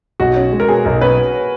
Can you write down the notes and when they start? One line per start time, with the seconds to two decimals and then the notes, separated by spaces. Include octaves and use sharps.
0.20 B1 F#4
0.36 C#4
0.52 G#3
0.60 A#4
0.68 B2 G#4
0.85 B1 A#4
1.01 C#4 B4